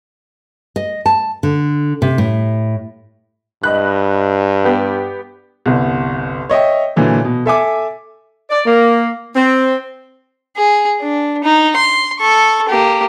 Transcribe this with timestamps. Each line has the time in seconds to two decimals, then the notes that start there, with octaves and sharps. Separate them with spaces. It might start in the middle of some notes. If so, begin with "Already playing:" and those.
0.76 D#5
1.06 A5
1.43 D3
2.02 C3
2.18 A2
3.63 G2 D#5 B5 F#6
4.65 B3 G4
5.66 G1 C2
6.49 C#5 D#5 E5 G5
6.96 A#2 D3 E3 F#3
7.25 B2
7.46 A4 E5 G#5 D6
8.50 D5
8.66 A#3
9.36 C4
10.57 G#4
11.01 D4
11.44 D#4
11.76 C6
12.19 A4 C#6
12.69 A#3 G4